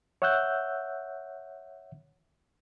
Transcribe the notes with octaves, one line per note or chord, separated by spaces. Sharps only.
C#5 E5 F#5 E6 F#6 G6